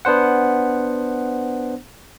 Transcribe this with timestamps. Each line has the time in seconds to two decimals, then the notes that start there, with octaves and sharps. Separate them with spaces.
0.05 B3 D4 C5 F#5